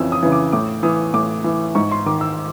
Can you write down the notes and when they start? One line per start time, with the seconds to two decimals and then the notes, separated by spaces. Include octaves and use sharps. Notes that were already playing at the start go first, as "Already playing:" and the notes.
Already playing: F2 C#3 E3 E6
0.12 D#6
0.23 C#3 E3
0.32 D6
0.52 A2 D6
0.83 E3 D#6
1.14 A2 D6
1.44 E3
1.75 G#2 C#6
1.91 C6
2.06 D#3 D6
2.21 E6